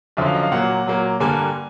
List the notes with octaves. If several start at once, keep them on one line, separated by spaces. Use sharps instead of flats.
F#2 D3 F3 E5
F5
D#5
F5
A#2 F#3 A#3 F#5
A#2 F#3 A#3
G2 D3 G3 A#3 G#5